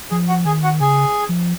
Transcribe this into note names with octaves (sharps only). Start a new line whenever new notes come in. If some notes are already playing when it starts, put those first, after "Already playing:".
F3 G#4 G#5
F#4 F#5
D#3 G#4 G#5
F#4 F#5
C#3 G#4 G#5
F3